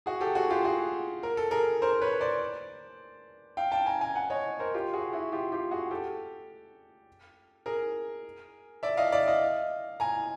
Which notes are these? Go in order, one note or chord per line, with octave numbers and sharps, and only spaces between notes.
F#4 G#4
G4 A4
F#4 G#4
F4 G4
F#4 G#4
A#4
A4
G#4 A#4
A#4 C5
B4 C#5
C5 D5
F5 G5
G5 A5
G#5 A#5
G#5 A#5
F#5 G#5
C#5 D#5
A#4 C5
F4 G4
F#4 G#4
E4 F#4
F4 G4
F4 G4
F#4 G#4
G4 A4
G#4 A#4
D5 E5
D#5 F5
D5 E5
D#5 F5
G#5 A#5